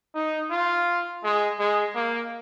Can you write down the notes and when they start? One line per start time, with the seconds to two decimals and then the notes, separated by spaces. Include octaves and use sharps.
0.15 D#4
0.51 F4
1.24 G#3
1.59 G#3
1.95 A#3